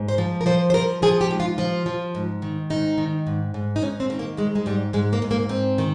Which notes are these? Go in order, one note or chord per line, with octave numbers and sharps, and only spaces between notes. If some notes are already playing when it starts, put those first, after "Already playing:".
Already playing: G#2
C5
F3
A#4
F3 C5
C5
F3 A#4
F3 G#4
G4
G#2
F4
F3 F4
F3
G#2
D#3
G#2 D#4
D#3
G#2
G#2
D#4
G#2 C#4
C4
D#3
A#3
G#2 G#3
G#3
G#2 G3
G#2 G#3
A#3
G#2
A#3
G#2 C4
D#3